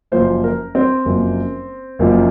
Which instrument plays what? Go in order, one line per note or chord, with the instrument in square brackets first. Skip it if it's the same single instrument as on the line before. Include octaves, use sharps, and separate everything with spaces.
[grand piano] F#1 F#2 F3 A#3 [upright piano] C5
[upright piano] A#4
C4
[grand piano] F#1 F#2 F3 A#3
F#1 F#2 F3 A#3